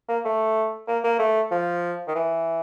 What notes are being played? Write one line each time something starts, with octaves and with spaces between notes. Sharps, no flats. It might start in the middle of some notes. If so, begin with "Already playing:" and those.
A#3
A3
A#3
A#3
A3
F3
D#3
E3